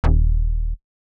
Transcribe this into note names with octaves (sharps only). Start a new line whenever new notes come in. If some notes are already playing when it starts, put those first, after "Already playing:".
D#1